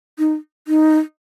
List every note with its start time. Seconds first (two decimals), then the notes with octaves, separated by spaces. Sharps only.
0.19 D#4
0.68 D#4